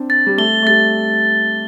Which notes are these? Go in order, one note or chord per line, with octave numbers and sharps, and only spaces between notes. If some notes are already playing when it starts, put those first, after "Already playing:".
Already playing: C4 D4
A6
G3
A3 G7
A3
G3 A6